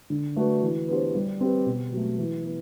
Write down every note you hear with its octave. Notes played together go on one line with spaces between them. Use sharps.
D3
A3 D4 F#4 B4
E3
B3 D4 G4 C5
G3
C4 G4 B4
B2
F#3 A3
E3
B3